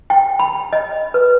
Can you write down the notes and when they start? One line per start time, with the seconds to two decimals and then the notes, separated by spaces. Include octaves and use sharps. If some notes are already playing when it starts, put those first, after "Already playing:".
0.10 G5
0.39 B5
0.73 D#5
1.14 B4